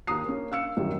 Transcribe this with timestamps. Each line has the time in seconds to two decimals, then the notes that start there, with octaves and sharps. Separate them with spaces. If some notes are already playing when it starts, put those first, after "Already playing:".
0.07 D#2 A#5 D#6 C7
0.25 A#3 C#4
0.51 F5 E6 C#7
0.77 A1 F#2 D#3 G3